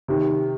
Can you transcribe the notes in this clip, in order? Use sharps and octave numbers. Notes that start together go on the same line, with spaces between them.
C3 D#3